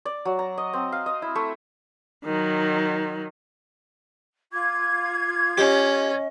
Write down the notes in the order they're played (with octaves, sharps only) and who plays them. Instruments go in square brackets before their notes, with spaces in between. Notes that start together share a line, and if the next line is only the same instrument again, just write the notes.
[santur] D5
F#3
A#5
D#5
C4
F5
D#5
E4
A3
[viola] D#3 F#3
[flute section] F4 G#6 [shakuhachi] D6
[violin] C#4 [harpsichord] G4 [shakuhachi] D#5